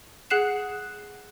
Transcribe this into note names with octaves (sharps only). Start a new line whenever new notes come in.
G#4 F#5 F#6 C7 E7